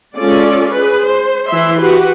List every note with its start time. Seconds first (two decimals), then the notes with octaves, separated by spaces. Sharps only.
0.17 G#3 C#4 F4 A4 D5
0.70 G#4 B4
1.05 C5
1.49 E3 E4 E5 C6
1.80 F#4 G4 B4